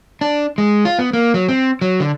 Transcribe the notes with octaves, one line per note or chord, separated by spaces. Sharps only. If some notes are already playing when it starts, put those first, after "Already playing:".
D4
G#3
F4
B3
A#3
F#3
C4
F#3
D3